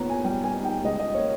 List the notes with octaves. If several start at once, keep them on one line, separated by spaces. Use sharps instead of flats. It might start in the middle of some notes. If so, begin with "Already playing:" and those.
Already playing: A#2 B3 C#5 A#5
G#5
G3 G5
G#5
D#4
G5
C#2 D#5
D#5
A#3 C#5